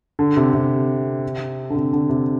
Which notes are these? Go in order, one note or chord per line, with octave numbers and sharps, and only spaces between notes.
D3
C3
C3
D3
C3
D3
C3